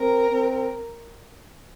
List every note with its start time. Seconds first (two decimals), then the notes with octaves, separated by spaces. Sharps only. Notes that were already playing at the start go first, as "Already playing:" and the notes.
Already playing: C4 A#4
0.31 C4